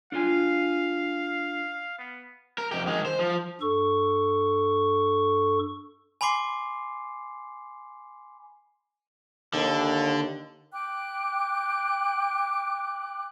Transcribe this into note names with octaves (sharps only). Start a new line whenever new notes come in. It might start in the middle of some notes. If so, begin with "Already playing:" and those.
D4 F4 F5 G#5
B3
A#4
F2 G4
D#3 G#3
C5
F3
G2 A4 C#6
G#5 B5 C6 D6 C7
D#2 D3
G5 D6 F#6